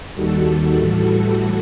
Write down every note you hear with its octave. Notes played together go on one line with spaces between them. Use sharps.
D#2 D#3 G3 F#4 A4
A2 E3 G3